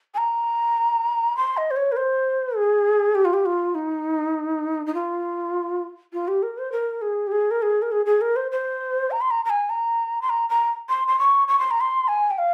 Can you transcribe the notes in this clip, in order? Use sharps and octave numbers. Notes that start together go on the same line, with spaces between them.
G#5
A#5
C6
D#5
C5
C#5
A#4
C5
G#4
G4
F4
G4
F4
D#4
D#4
F4
F4
G4
A#4
C5
A#4
G#4
G4
G#4
A#4
G#4
A#4
G#4
G#4
A#4
C5
C5
A#5
C6
A#5
A#5
G#5
A#5
C6
A#5
A#5
C6
C6
C#6
C#6
C6
A#5
C6
G#5
G5
F5